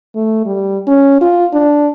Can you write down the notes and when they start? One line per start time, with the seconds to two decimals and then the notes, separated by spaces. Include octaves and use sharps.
0.15 A3
0.45 G3
0.87 C#4
1.21 F4
1.53 D4